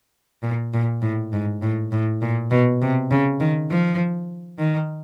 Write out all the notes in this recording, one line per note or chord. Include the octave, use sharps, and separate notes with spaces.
A#2
A#2
A2
G#2
A2
A2
A#2
B2
C3
C#3
D#3
F3
D#3